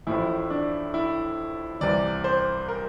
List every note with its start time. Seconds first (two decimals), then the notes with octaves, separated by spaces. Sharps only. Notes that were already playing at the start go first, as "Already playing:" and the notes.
0.07 A1 A2 F3 E4
0.50 D4
0.94 E4
1.81 C2 C3 E3 D5
2.24 C5
2.68 A#4